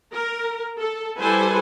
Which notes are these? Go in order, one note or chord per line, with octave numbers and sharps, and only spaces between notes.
A#4
A4
G3 E4 A4 B4 C5 G#5